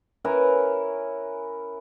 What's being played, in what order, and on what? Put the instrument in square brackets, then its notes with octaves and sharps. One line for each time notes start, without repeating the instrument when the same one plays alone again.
[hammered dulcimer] C#4 E4 A#4 B4